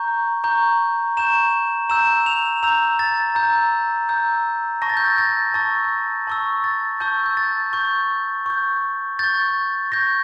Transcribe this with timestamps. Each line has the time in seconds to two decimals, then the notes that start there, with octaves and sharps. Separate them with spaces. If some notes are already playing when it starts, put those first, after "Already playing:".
Already playing: A#5 C#6 G6
0.44 A#5 C#6 G6
1.17 A#5 C#6 G6 E7
1.89 A#5 E6 G6 E7
2.26 F7
2.63 A#5 E6 G6 F7
2.99 A6
3.35 A#5 E6 G6
4.09 A#5 E6 G6
4.82 A5 C#6 E6 A#6
4.90 A6
4.97 G6
5.05 A6
5.18 A6
5.54 A5 C#6 E6 A6
6.27 A5 C#6 E6
6.64 A6
7.00 A5 C#6 E6 G6
7.26 G6
7.37 A6
7.73 C#6 G6
8.46 C#6 G6
9.19 C#6 G6 A6
9.92 C#6 G6 A#6